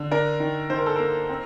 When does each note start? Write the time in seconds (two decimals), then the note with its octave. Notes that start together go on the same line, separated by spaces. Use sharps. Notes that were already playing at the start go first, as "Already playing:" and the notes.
Already playing: D3
0.11 D4 A#4
0.40 D#3
0.70 D#3 C5
0.78 A#4
0.86 A4
0.96 A#3 A#4
1.29 C4